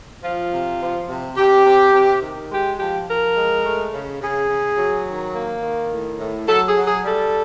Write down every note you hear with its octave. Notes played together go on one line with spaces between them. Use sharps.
F3 F4
C3
F3
C3
C3 G4
C3
C3
D#3
G#3 G4
F3 G4
F3 A#4
G#3
A3
C#3
C#3 G#4
C#3
F#3
D#3
A#3
D#3
A2
A2
F#3 A4
G#4
F#3
G#4
G3 A4